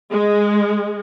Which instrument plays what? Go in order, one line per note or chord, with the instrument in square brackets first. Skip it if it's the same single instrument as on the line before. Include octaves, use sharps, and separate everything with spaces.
[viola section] G#3